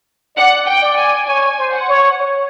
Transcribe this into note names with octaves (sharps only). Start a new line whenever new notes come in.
D5 F#5
G5
D5
G#5
C#5 G#5
C5
F#5
C#5
C#5